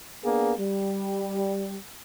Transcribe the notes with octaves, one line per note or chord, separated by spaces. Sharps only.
A#3 B3 D4 G#4
G3